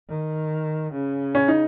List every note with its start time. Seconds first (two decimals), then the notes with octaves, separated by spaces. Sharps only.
0.09 D#3
0.93 C#3
1.35 C#4
1.48 D#4